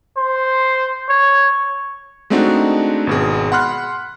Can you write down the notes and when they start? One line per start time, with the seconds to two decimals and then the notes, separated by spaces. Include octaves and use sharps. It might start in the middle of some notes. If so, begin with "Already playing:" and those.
0.17 C5
1.09 C#5
2.30 G#3 A3 C4 D4 D#4 F#4
3.07 G#1 B2 G#4
3.52 F#5 B5 C6 F6 F#6